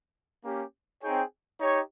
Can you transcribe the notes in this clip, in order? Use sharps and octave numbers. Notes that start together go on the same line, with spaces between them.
A#3 C#4 G4
C4 D#4 G#4 C#5 G5
D#4 G4 C#5